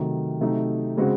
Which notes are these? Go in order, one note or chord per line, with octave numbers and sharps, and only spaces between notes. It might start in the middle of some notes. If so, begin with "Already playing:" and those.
Already playing: C3 D#3 F#3 A3
C3 F#3 A3 D#4
C#3 G#3 C4 F#4